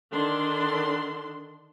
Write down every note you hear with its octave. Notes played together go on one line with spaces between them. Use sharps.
D3 D#3 D4 C6